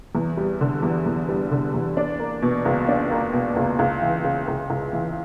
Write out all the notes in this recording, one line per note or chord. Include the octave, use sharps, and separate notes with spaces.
E2
G3
D3
E2
E2
G3
D3
E2
D4
A#3
B2
C#2
D4
A#3
B2
C#2
C#2
E3
C#3
C#2
C#2
E3